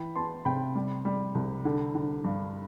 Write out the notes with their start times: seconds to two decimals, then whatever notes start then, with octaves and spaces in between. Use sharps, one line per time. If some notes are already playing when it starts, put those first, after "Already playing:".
Already playing: E3 G5 B5
0.15 B3 A5 C6
0.45 C3 G5 B5
0.75 G3
1.05 G3
1.35 C2
1.65 D3
1.95 D3
2.24 G2